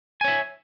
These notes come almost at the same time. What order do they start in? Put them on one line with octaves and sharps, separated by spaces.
G#5 C#5 E5